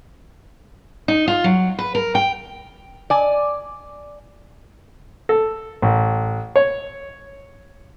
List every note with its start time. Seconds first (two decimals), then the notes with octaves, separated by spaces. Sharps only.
1.08 D#4
1.28 F4
1.44 F#3
1.79 B4
1.95 A#4
2.15 G5
3.10 D5 G#5
5.29 A4
5.82 A1
6.56 C#5